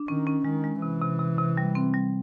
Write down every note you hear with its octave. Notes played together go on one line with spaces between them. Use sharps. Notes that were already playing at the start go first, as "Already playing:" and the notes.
Already playing: D4
D#3 C#4
C#4
D#3 G#3
G#3
C3 E3
C3
C3
C3
G3
C4
G3